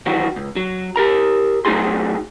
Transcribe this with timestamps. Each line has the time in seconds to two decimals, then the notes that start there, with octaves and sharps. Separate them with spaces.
0.06 D#3 E3 F#3 F#4
0.36 C#2
0.56 F#3
0.96 G4 A#4 A#5
1.65 F#3 A3 D#4 F#4 G#4 C6